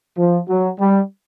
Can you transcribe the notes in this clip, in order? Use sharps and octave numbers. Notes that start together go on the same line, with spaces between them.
F3
F#3
G3